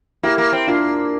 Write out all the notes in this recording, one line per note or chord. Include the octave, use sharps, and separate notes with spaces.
A#3 E4 G4
A#3
C4
A#3 D4 F4